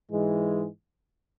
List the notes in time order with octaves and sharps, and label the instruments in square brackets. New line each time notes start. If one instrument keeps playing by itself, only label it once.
[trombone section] G#2 E3 G#3